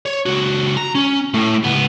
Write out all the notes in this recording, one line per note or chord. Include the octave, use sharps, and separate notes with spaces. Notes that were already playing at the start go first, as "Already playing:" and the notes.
C#5
C#2 F#4
A#5
C#4
A2 A3
C#2 B3